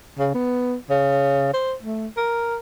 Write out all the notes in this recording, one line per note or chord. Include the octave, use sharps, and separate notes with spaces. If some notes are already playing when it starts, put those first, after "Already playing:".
C#3
B3
C#3
C5
A3
A#4